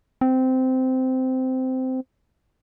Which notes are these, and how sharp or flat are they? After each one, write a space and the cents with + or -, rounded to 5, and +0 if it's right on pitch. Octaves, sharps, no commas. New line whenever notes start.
C4 -15